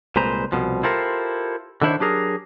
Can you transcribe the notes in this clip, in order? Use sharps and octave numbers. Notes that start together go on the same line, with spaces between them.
C2 A#2 G#3 B4 C5 A#5
C2 B2 F3
E4 F4 G4 A4 A#4 C5
D3 D#3 D4 E4 C5 C#5
F#3 D4 G4 G#4 A#4